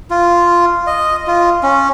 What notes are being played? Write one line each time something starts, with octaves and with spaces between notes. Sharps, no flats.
F4
D#5
F4
C#4